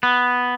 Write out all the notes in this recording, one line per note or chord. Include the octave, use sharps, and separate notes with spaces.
B3